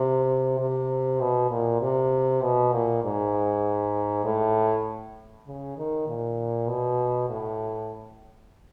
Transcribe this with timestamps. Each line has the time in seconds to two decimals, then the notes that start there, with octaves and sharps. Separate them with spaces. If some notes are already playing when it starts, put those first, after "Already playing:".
Already playing: C3
0.59 C3
1.20 B2
1.50 A#2
1.81 C3
2.42 B2
2.73 A#2
3.03 G#2
4.24 A2
5.47 C#3
5.77 D#3
6.08 A#2
6.68 B2
7.29 A2